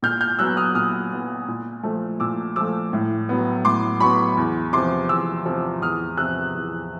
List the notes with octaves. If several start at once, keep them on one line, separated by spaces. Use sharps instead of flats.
A#2 F6 G6
F6 G6
F#3 B3 E6 F#6
D#6 F6
A#2 D#6 F6
F#3 B3
A#2
F3 A3
A#2 D6 E6
F3 A3 D6 E6
A2
F#3 B3
A2 C6 D6
F#3 B3 B5 C#6
E2
C3 F3 C6 D6
E2 D6 E6
C3 F3
E2 D#6 F6
C3 F3 E6 F#6
E2